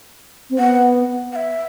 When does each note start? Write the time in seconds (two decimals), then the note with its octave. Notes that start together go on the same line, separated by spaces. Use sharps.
0.50 C4
0.59 B3 F#5
1.32 F#5
1.36 E5